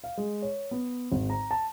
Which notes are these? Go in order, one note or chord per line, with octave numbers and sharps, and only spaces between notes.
F5
G#3
C#5
B3
G#1
A#5
A5